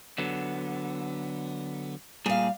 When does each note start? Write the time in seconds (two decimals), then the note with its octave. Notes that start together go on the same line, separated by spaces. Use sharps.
0.18 D3 F#3 B3
2.26 A#2 G3 G#4 F5